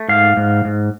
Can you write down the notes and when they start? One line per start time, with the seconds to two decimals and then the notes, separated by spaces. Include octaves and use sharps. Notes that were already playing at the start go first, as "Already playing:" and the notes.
Already playing: A3
0.08 G#2 F5
0.37 G#2
0.65 G#2